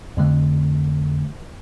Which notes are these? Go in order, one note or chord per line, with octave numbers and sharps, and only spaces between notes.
F2 D3 A3